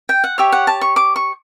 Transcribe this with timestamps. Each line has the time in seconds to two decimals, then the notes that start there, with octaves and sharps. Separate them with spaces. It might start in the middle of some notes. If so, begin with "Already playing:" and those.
0.09 G5
0.24 F#5
0.38 G4 C#5 E5
0.52 F#5
0.67 A5
0.81 C#6
0.96 D6
1.16 C#6